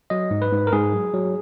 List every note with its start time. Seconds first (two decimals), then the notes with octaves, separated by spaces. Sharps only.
0.10 F#3 D#5
0.31 G#2
0.42 B4
0.52 G#2
0.67 A#4
0.72 G#2 G#4
0.93 F#3
1.14 F#3